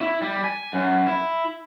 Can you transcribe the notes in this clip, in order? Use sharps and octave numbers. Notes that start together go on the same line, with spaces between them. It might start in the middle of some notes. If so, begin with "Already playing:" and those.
E4
G3
G#5
F#2
E4